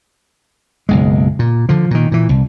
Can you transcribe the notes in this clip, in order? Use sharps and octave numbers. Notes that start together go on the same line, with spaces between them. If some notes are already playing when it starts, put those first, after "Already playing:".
F#1 B1 G#3
A#2
D3 F3
A#2 D#3
A#2 E3
C2